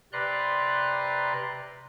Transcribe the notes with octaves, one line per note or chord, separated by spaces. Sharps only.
C3 B4 D5 A#5 C6 F#6